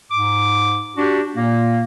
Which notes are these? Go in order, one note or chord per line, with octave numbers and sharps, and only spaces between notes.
G#2 D6
D4 F#4 G4
A#2 A#3